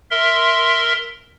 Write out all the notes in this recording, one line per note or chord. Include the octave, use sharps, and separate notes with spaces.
A#4 E5 C6